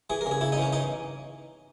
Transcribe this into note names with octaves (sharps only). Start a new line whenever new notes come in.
E3 G#4
A#4
C#3
G#4
C#3 E4
D#4
E3 C#4
E3 D#4